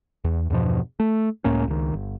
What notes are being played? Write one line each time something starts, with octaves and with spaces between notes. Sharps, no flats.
E2
E2 G2 B2 F3
A3
C#2 A2 A#3 C#4
C#2 D#3
G1